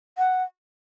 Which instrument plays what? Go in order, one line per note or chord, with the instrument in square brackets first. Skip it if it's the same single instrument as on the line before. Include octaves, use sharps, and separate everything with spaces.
[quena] F#5